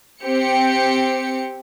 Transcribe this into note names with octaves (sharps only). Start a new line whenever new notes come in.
C4 G4 C#7